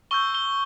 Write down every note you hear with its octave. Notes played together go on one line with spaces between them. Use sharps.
C#6 E6 G6 G7
G7